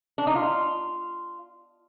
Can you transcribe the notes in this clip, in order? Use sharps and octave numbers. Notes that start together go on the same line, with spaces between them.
D4
D#4
F4